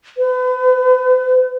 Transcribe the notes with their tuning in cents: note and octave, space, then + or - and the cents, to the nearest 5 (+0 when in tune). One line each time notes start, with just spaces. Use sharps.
B4 +40